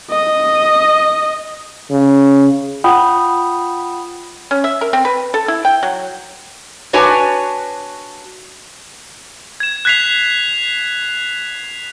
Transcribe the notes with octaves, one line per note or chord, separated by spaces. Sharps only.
D#5
C#3
F4 F#5 G5 B5 D#6
C#4
E5
A#4
C4
B4
A4
E4
G5
F#3
D4 F#4 B4 C#5 G#5
G#6 E7
F#6 G#6 B6 C7 F7